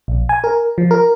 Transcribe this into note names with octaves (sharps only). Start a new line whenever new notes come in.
A#1
G#5
A#4
F3
A#4